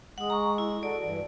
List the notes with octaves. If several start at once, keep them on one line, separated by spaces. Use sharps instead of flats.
G#3 F#5 D#6
A#5 C#6
E4
F#4 A4 D5
G2 E3